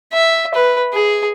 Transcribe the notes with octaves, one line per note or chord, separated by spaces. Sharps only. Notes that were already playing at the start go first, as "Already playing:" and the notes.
E5
B4
G#4